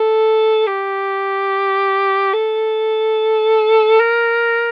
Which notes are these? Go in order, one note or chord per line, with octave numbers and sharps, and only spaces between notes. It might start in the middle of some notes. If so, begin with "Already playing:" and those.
Already playing: A4
G4
A4
A#4